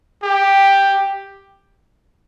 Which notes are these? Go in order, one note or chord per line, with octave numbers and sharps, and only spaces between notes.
G4